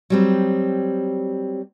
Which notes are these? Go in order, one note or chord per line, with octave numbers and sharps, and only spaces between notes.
F#3 G3 C4